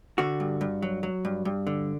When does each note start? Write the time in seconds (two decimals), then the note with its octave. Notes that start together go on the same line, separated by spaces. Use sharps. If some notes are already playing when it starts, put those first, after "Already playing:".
0.18 D3 F#4
0.40 G2
0.61 G2
0.82 F#3
1.03 F#3
1.25 G2
1.45 G2
1.67 D3